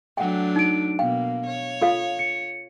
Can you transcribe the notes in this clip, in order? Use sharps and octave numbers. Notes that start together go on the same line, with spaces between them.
F#3 A3 D4 F#5 G5
D#4 D7
B2 A#3 F5 G5
C#5
F4 A4 F5
C#7